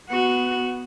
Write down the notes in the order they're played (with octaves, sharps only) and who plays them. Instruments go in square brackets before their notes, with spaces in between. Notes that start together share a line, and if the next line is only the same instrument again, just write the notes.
[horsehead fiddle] B3 [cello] F#4